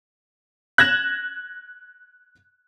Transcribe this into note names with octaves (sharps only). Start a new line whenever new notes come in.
F#6 G#6 A#6 E7